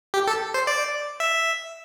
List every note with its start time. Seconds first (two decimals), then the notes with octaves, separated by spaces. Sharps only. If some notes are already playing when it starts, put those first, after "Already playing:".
0.14 G4
0.27 A4
0.54 C5
0.67 D5
1.20 E5